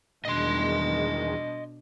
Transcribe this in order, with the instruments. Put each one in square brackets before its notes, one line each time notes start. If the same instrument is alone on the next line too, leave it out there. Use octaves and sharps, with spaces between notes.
[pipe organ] E2 D#3 G#3 [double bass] B2 D4 [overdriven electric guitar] D#5 C6